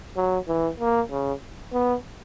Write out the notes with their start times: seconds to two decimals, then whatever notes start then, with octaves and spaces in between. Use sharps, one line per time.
0.17 F#3
0.48 E3
0.80 A#3
1.11 C#3
1.73 B3